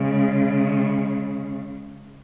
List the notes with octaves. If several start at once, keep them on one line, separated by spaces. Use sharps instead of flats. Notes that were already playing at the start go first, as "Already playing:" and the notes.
Already playing: C#3 G#3